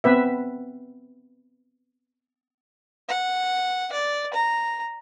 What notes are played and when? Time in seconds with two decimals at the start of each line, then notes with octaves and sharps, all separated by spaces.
0.04 B3 C4 B4 E5
3.08 F#5
3.92 D5
4.34 A#5